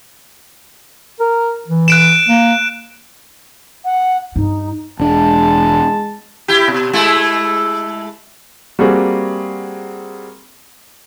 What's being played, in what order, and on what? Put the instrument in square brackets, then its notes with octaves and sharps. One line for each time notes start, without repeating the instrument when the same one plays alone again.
[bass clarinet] A#4
E3
[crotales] F#6 D7 E7
[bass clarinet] A#3
[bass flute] F#5
[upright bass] G2 [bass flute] D#4
[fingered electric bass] E1 D4 [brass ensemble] G#3 A5
[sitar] E4 G4
B2
G#3 A3 E4
[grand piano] G3 A#3 C4 F#4 G#4